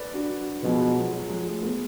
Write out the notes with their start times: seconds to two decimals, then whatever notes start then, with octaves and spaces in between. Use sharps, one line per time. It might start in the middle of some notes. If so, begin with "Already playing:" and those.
Already playing: A4 B4 D5
0.14 D4 F#4
0.63 B2 F3 G#3
0.81 F#3
0.96 F3
1.13 F#3
1.29 F3 G#3
1.45 F#3 A3
1.62 G#3 B3